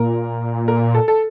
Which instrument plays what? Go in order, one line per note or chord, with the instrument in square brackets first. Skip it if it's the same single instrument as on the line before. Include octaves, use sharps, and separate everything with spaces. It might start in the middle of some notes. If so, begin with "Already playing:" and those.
Already playing: [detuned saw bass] A#2 [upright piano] A#4
[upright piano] A#4
A4
A4